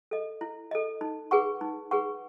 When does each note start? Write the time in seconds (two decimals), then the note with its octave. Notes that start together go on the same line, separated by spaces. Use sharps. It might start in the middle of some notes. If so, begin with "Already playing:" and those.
0.11 A4 D#5
0.41 E4
0.71 A4 D#5
1.01 D#4
1.31 G#4 B4 F#5 C#6
1.61 D#4
1.91 G#4 B4 F#5 C#6